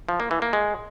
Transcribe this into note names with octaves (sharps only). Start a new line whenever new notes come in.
F3
A#3
E3
A#3
G#3